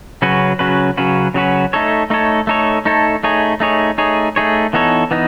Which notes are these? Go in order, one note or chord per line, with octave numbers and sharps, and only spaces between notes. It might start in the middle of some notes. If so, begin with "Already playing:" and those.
C#3 F#3 C#4 F#4 B4
C#3 F#3 C#4 F#4 B4
C#3 F#3 C#4 F#4 B4
C#3 F#3 C#4 F#4 B4
A3 D#4 A4 C#5
A3 D#4 A4 C#5
A3 D#4 A4 C#5
A3 D#4 A4 C#5
A3 D#4 G#4 C#5
A3 D#4 G#4 C#5
A3 D#4 G#4 C#5
A3 D#4 G#4 C#5
E3 B3 D#4 A4 C#5
E3 B3 D#4